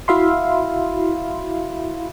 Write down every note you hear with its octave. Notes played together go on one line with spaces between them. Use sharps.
E4 F#4 E5 F5 B5 C6